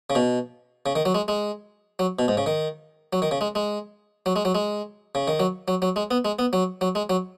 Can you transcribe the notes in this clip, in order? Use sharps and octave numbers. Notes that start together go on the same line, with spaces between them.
C#3
B2
C#3
D#3
F#3
G#3
G#3
F#3
B2
G#2
C#3
D#3
F#3
D#3
C#3
G#3
G#3
F#3
G#3
F#3
G#3
C#3
D#3
F#3
F#3
F#3
G#3
B3
G#3
B3
F#3
F#3
G#3
F#3